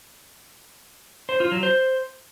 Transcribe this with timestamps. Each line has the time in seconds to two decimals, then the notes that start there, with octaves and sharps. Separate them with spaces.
1.29 C5
1.40 F4
1.52 F#3
1.63 C5